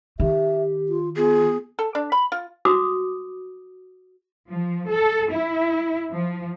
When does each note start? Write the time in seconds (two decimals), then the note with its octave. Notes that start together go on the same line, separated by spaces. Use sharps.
0.20 D#3 G4 E5
0.89 F4
1.17 B3 F4 G#4
1.79 A4
1.95 D4
2.12 B5
2.32 F4
2.65 F#4 D6 D#6
4.49 F3
4.89 A4
5.31 E4
6.11 F3